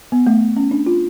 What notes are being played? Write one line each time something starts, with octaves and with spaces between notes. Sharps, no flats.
B3
A3
C#4
D4
F4